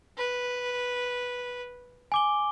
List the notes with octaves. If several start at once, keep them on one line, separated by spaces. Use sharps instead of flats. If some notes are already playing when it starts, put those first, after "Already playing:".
B4
G#5 D6 G7